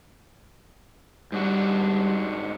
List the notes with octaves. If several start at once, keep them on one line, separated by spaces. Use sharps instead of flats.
G#2 G3 D4 F#4